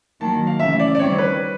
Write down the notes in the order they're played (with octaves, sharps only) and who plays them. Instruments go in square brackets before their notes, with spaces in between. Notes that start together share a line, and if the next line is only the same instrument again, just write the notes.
[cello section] D#3 F#3 A#3 [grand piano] A5
[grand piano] F5
[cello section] C#3 E3 A3 [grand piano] E5
[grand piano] D5
D5
[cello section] D#3 G3 C4 [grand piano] C#5
[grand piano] B4